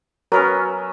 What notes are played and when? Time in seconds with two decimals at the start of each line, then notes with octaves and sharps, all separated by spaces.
0.32 F#3 B3 C#4 A#4